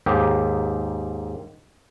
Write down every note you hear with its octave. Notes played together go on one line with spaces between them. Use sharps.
D#2 G#2 G4